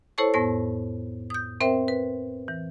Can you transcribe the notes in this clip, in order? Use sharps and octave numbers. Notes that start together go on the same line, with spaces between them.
E4 A4 C5 C#5 A5 C#6
F2 A2 B3 A#6
D#6 G6
C4 A#4 C5 E5 G5
B4
E3